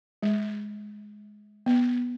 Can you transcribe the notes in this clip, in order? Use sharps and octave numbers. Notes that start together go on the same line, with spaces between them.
G#3
B3